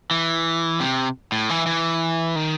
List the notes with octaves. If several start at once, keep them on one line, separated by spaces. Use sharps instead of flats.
E3
C3
A2
E3
E3
D#3